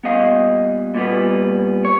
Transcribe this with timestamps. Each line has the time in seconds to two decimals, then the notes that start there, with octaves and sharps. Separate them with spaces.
0.04 A#2 G3 B3 D#5 F5
0.95 A#2 G3 B3
1.85 C#5